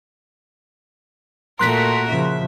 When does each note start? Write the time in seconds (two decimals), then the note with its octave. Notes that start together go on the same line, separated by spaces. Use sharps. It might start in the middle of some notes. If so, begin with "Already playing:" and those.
1.59 A#2 A3 F#4 A#4 C6 F#6 B6
2.08 C#3 F3 E5